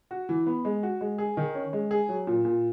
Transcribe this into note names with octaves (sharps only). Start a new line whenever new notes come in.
F#4
E3
B3
G#3
F#4
G#3
G#4
D#3
C#4
G#3
G#4
F#3
A#2
A#2